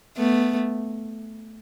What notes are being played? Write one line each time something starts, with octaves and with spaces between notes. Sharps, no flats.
A3 B3